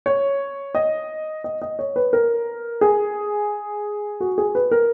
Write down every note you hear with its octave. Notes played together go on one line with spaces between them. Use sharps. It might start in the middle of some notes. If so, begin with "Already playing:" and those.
C#5
D#5
D#5
D#5
C#5
B4
A#4
G#4
F#4
G#4
B4
A#4